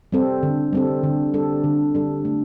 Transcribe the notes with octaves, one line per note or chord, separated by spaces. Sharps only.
G3 C4 A4
D3
G3 C4 A4
D3
G3 D4 A4
D3
G3 D4 A4
A3